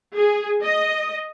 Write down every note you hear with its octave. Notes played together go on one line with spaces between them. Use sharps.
G#4
D#5